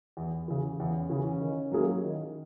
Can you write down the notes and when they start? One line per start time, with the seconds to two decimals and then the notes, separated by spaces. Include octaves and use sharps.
0.17 E2
0.48 C#3 E3
0.79 E2 C#4
1.10 C#3 E3
1.41 D#3
1.72 F#3 A#3 E4 G#4
2.03 D#3